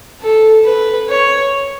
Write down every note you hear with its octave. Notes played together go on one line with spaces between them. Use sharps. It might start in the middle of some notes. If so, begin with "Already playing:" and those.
A4
B4
C#5